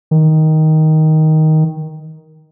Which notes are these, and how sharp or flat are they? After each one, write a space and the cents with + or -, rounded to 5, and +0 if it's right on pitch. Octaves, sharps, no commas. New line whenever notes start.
D#3 +10